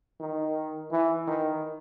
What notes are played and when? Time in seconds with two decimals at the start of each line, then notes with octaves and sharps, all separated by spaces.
0.20 D#3
0.91 E3
1.27 D#3